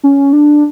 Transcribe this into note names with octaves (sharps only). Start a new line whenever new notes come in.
C#4
D4